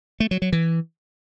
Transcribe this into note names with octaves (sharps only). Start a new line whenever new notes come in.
A3
F#3
F#3
E3